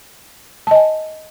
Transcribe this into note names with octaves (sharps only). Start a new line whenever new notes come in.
D#5 G#5 A5